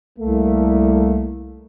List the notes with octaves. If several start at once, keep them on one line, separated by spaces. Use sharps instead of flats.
C2 A3 A#3